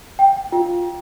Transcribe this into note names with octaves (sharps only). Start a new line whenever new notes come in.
G5
F4